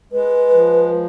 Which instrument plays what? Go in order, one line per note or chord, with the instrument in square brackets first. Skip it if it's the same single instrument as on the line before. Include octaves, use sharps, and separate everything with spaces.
[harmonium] G#3 [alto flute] B4
[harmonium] F3